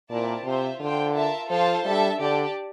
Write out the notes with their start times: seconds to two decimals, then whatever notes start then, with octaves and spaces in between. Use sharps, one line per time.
0.10 A#2 C4 E4 A#4 D5 A5
0.45 C3 F4 C5 E5
0.80 D3 F4 C5 G5
1.15 F4 A#4 E5 A5
1.50 F3 F4 A4 C5 F5 A5
1.85 G3 D4 A4 E5 A5
2.20 D3 D4 G4 D5 A5